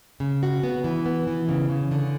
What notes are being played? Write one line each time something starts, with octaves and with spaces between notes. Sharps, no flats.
C#3
F#4
B3
E3
B3
E3
C#3
C#3
D3